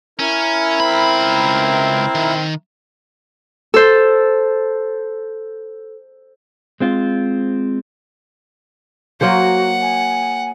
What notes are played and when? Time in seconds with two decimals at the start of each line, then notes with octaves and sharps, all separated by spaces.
0.19 C#4 E4 A#4
0.80 C#2 C4 B5
2.15 D#3
3.74 A4 C5
6.80 G#3 C4 F4
9.21 F#3 A#3 F#4 C5 F#5
9.82 G#5